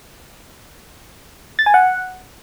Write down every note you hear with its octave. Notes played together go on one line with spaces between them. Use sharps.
A6
G#5
F#5